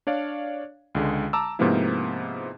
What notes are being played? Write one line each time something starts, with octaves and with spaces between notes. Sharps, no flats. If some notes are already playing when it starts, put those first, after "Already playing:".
D4 C#5 D5 F5
C#2 D3 G#3
A5 A#5 D6 E6
G#2 C3 F3 A#3 B3 E4